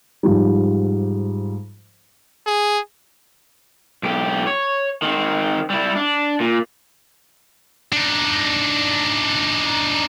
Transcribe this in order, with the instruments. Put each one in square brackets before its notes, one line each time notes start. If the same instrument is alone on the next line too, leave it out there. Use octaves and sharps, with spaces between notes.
[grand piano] G#2 F3 G3
[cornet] G#4
[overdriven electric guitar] B1 G4
C#5
D#3 C4
G3 E4
D4
A#2
[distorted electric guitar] D4 D#4